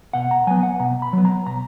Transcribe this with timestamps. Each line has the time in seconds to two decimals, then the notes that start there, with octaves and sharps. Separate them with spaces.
0.13 B2 F#5
0.31 A#5
0.47 F#3 B3 G#5
0.63 F#5
0.80 B2 A#5
1.02 B5
1.13 F#3 B3
1.25 A#5
1.47 B2 A#5